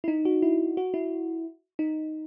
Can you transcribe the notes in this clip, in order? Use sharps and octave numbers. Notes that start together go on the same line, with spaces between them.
E4
D#4
F#4
E4
F#4
E4
D#4